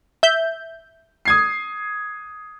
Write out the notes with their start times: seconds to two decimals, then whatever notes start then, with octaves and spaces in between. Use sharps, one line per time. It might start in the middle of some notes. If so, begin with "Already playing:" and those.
0.23 E5 G6
1.25 D#6 G#6 C7